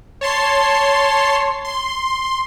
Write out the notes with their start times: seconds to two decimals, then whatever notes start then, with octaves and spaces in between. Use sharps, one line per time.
0.21 C#5 A5 C6 C7
1.65 C6